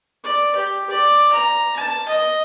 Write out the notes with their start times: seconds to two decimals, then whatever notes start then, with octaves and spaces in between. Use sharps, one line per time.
0.24 D5
0.56 G4
0.90 D5
1.33 A#5
1.76 A5
2.08 D#5